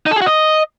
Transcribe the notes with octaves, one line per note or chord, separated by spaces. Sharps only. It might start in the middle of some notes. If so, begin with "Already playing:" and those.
D#4
A4
G#4
F#4
D#5